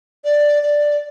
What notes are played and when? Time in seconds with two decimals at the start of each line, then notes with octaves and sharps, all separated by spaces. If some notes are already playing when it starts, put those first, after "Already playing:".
0.25 D5
0.63 D5